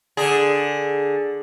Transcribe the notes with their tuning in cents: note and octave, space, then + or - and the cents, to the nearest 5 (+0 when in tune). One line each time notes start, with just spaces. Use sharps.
D3 +0 G#4 +0